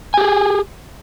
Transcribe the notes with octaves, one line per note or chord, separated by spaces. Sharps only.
G4 G#4 G#5